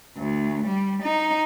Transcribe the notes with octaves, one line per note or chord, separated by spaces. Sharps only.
D2
G3
D#4